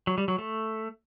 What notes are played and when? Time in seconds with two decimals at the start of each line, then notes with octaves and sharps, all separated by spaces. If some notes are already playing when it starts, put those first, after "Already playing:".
0.07 F#3
0.18 G3
0.28 F#3
0.39 A3